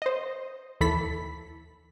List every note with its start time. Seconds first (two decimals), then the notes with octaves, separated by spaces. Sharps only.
0.02 C5 D#5
0.81 D#2 E3 A4 B5 B6